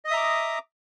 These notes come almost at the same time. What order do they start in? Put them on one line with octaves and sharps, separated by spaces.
D#5 D#6 E5 A#5 D6